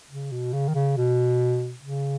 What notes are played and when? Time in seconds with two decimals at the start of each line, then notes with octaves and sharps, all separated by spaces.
0.10 C#3
0.32 B2
0.53 C#3
0.68 D#3
0.75 C#3
0.97 B2
1.84 C#3